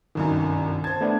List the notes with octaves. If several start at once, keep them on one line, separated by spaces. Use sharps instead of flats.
G1 C2 F#2 D#3
C5 A5 G#6
A3 B3 D4